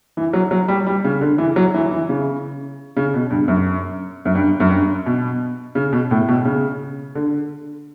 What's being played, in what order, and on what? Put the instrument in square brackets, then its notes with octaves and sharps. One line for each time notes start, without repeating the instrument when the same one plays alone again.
[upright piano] E3
F#3
F#3
G3
G3
C#3
D3
E3
F#3
E3
E3
C#3
C#3
B2
G2
F#2
F#2
G2
F#2
G2
B2
C#3
B2
A2
B2
C#3
D3